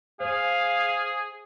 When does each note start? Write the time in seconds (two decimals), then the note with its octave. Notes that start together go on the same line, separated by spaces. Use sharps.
0.20 G#4 C5 F5 G#5